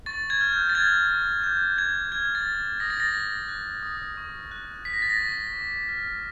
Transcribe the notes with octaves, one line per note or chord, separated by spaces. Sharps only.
C#6 A6
G#6
F6
G6
A6
F6 G#6
C#6
D6 G6
F6 G#6
F6 G#6
A6
D6
D#6 A#6
A6
A#6
F#6
F#6
D#6
C#6
F#6
F#6 B6
A#6
A6
A#6
C#6
D6
F6